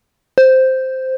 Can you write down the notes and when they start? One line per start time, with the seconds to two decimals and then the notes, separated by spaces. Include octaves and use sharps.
0.38 C5